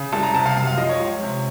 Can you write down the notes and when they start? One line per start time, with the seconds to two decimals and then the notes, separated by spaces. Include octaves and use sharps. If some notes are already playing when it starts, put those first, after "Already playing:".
Already playing: C#3
0.12 C2 A5
0.23 A#5
0.34 C3 A5
0.46 F5
0.57 F#2 F5
0.67 F5
0.78 F3 D#5
0.89 C#5
1.00 C#2
1.22 C3